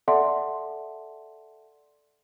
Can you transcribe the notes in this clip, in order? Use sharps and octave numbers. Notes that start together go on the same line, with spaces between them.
A4 D5 E5 F#5 A5 C6